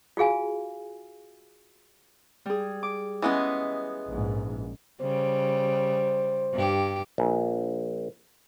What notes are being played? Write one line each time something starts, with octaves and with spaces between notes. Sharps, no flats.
F4 F#4 G#4 F5 G#5
G3 G#4
D6
E3 G#3 B3 C#4 D#5
A#1 G#2
C#3 G3 C5
G2 G4
A#1